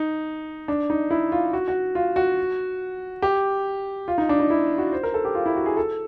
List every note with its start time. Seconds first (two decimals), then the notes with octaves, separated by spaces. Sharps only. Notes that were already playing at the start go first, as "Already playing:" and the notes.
Already playing: D#4
0.68 D4
0.90 D#4
1.11 E4
1.32 F4
1.53 F#4
1.68 F#4
1.95 F4
2.16 F#4
3.22 G4
4.08 F4
4.18 D#4
4.29 D4
4.40 D#4
4.50 E4
4.78 F#4
4.93 C5
5.03 A#4
5.14 A4
5.25 G4
5.35 F4
5.46 E4
5.56 F#4
5.66 G#4
5.77 A4